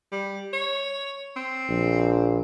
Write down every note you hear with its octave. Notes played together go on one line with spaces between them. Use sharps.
G3
C#5
C4
A#1